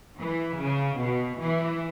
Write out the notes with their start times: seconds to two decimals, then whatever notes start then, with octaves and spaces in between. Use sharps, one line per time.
0.19 E3
0.59 C#3
0.98 B2
1.38 E3